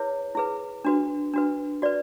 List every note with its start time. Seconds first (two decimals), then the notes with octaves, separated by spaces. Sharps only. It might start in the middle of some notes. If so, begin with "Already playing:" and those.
Already playing: E4 G#4 B4 C#5
0.35 E4 G#4 B4
0.85 D4 F#4 B4
1.34 D4 F#4 B4
1.82 F#4 B4 D5